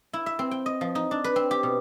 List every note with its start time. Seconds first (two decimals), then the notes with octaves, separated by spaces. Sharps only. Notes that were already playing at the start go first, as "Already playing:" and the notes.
0.13 E4
0.26 E5
0.39 C4
0.51 G5
0.66 D#5
0.81 F3
0.95 D#4
1.11 D4
1.24 B4
1.36 C4
1.51 G4
1.63 B2